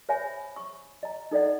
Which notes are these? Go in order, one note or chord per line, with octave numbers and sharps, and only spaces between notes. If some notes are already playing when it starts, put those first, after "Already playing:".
C5 C#5 E5 G#5 B5
C#6
D#5 A#5
D#4 A4 D5 D#5 F#5